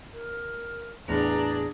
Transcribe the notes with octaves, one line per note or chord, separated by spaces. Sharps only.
A#4
E2 A2 D4 G#4 B4 A#5